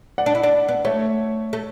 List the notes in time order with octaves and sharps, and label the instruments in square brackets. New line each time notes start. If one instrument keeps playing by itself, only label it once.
[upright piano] D5 F#5
[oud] D4
E4
D4
B3
[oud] A3 [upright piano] C#5 E5
[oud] A3